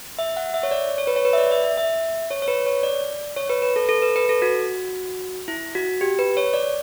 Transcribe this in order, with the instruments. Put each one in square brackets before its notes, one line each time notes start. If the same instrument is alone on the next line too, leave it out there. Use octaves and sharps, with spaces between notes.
[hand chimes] E5
F#5
E5
C#5
D5
C#5
B4
C#5
B4
E5
D5
E5
E5
E5
C#5
C#5
B4
C#5
D5
C#5
B4
B4
A4
A4
B4
B4
A4
F#4
E4
F#4
G4
B4
C#5
D5